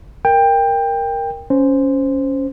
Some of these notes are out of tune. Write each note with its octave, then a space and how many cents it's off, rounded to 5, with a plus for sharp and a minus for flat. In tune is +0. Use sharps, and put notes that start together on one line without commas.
A#4 +0 G5 +20
C#4 +0 C5 -5